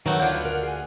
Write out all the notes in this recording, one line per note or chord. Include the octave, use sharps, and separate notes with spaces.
D#3 F#3 A3 B3 A#4 G5
D2 D4 F4 B4 C#5 F#5 G6
A#4
G#4 G#5